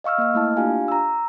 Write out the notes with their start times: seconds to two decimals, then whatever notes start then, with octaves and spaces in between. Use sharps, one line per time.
0.04 D#5 F5 C#6 E6 F6
0.18 A#3 D#5 F6
0.34 A3 A#3 E4 A5
0.57 D4 F4 G4 F5 G#5
0.88 A#5 E6